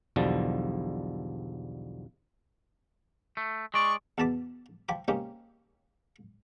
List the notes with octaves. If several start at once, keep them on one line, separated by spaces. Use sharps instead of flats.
B1 E2 B2 D3 F3 G3
A3
G#3 D5 C#6
E2 B2 A5 B5 D6
F3 G5 B5 D6
A#3 C4 C#4 D#4 G4